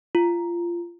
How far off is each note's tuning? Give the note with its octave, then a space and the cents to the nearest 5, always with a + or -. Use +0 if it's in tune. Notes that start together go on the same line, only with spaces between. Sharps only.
F4 -20